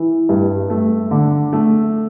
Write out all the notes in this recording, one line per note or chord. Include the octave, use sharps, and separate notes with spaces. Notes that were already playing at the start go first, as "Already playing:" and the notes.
Already playing: E3
G2
A3
D3
A3